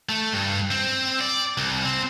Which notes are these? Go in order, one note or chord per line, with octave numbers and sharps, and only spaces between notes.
A3
G2
C4
D5
C2
C4